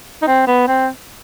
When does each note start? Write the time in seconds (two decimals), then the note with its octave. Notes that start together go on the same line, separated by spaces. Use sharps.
0.22 D#4
0.27 C4
0.47 B3
0.68 C4